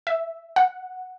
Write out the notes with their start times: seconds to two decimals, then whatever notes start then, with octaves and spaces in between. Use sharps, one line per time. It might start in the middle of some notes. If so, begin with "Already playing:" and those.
0.07 E5
0.56 F#5